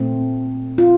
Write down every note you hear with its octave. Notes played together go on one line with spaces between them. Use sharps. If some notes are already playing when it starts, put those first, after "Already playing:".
Already playing: A#2 A3 C4
F4